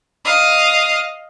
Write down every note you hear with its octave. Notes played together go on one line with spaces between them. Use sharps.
D#5 F5